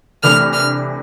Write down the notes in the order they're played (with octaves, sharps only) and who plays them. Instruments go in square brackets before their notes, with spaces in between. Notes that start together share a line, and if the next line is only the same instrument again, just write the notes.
[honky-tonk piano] C3 E3 A3 D4 [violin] F6
[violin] F6